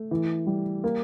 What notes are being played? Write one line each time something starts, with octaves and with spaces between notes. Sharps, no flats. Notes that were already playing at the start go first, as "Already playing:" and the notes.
Already playing: A3
E3
G3
A#3